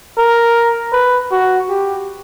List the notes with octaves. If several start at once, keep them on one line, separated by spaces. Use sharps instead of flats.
A#4
B4
F#4
G4